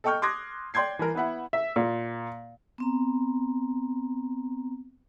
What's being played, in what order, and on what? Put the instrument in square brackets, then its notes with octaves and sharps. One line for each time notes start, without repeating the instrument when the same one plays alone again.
[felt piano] A4 D#5 G5 C#6 F6 G6
C6 D6 D#6 F#6 G#6 A#6
D5 G5 C6 G6 G#6 C7
E3 A#4
B3 E4 E5 F#5
[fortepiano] E5
A#2
[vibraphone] B3 C4 A#5